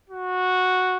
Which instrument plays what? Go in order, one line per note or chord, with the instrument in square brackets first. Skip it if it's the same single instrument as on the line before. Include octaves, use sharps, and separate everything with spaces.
[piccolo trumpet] F#4